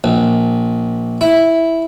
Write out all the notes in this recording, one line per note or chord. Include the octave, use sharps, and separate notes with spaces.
A#1
E4